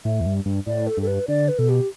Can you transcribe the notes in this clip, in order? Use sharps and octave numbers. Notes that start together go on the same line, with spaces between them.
A2 E5
E2
G2
G2
A2 D5
A4
G2 A4
B4
D3 D5
B4
B2 A4
G4